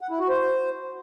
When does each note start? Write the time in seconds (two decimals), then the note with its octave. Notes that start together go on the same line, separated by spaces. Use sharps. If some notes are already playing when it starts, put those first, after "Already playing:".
0.01 F#5
0.10 E4
0.20 F#4
0.29 C5